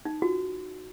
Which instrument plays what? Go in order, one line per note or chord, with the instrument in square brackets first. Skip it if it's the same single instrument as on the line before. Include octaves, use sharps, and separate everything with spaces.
[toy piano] D#4
[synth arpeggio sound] F4 [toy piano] F#4